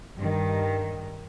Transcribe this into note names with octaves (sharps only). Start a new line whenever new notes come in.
G2 D#3